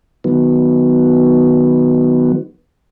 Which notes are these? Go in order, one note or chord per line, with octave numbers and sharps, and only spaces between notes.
D#3 F#3 B3